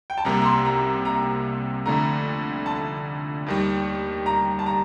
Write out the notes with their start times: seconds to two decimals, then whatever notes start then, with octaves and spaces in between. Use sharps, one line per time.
0.10 G5
0.18 A5
0.25 C2 C3 G3 A#3 A#5
0.41 A#5
0.45 C6
0.65 A#5
1.05 A#5
1.86 F2 D3 A3 A#5
2.66 A5
3.46 D#2 D#3 G3
4.26 A#5
4.59 A5
4.66 A#5